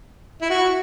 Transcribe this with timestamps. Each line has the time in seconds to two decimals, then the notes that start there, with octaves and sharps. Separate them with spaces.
0.41 E4
0.50 F#4